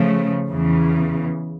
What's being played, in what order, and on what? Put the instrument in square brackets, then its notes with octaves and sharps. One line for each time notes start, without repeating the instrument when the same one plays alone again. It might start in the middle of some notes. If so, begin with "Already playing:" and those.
Already playing: [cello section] C#3 F3 A3
E2 C#3 E3